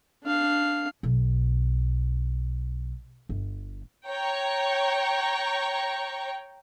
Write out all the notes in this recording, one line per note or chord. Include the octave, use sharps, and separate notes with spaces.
D4 F5
B1
G1
C#5 G5 A#5 C#6